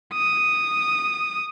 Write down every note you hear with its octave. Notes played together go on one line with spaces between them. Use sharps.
D#6